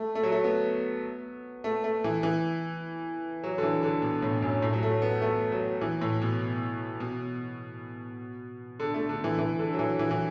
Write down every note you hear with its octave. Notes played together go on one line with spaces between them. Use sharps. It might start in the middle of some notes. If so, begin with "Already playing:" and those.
Already playing: A3
A3
F#3
A3
B3
A3
A3
E3
E3
F#3
D3
E3
D3
B2
A2
F#2
A2
F#3
A3
B3
A3
F#3
E3
A2
B2
B2
D3
A3
D3
E3
E3
D3
F#3
E3
E3
E3